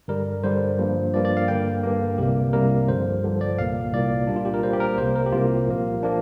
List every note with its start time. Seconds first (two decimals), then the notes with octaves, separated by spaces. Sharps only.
0.08 G2 D3 G3 A#4
0.43 G2 D3 G3 C5
0.78 G2 F3 A#3
1.14 G2 F3 A#3 D5
1.25 D5
1.37 F5
1.48 G2 D3 A#3 G5
1.83 G2 D3 A#3
2.18 C2 C3 G3 A#3 G4
2.53 C2 C3 G3 A#3 A#4
2.88 G2 D3 F3 C5
3.24 G2 D3 F3
3.41 D5
3.58 C2 A#2 A#3 F5
3.93 C2 A#2 A#3 D5
4.27 A#2 G3 A#3 D4
4.36 F4
4.45 G4
4.54 A#4
4.63 A#2 G3 A#3 C5
4.73 G4
4.80 A#4
4.98 C2 C3 A#3 C5
5.16 A#4
5.26 G4
5.32 C2 C3 A#3 F4
5.68 A#2 F3 A#3
6.03 A#2 F3 A#3 D4